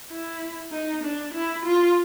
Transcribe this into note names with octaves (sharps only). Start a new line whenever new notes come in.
E4
D#4
D4
E4
F4